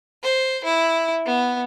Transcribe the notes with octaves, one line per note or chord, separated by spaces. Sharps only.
C5
E4
B3